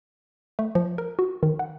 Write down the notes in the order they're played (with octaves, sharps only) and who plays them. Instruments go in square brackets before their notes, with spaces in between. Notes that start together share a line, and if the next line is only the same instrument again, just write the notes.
[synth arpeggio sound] A3
F3
A#4
F#4
D#3
F#5